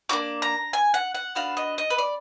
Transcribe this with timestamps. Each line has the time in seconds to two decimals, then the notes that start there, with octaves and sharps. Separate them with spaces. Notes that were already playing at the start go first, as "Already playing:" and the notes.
0.09 A#3 D4 F#4 D6
0.42 A#5
0.73 G#5
0.94 F#5
1.15 F#5
1.35 B3 D4 F#4 F5
1.57 D#5
1.78 D#5
1.90 B4
1.98 D5